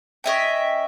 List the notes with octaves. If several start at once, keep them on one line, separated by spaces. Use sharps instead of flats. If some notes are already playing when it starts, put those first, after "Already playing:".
C#4 D#5 E5 G5